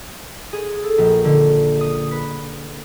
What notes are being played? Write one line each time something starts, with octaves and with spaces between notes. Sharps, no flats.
G#4
A4
A#1
D3
D#6
B4